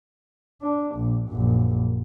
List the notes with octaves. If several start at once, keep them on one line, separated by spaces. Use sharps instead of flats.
D4
A#1
A#1 F#2